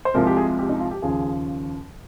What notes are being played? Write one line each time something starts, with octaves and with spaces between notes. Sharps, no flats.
C5
C2 C3 F3 G#3 A#4
G4
G#4
G4
D#4
F4
G4
D#2 C#3 F3 G#4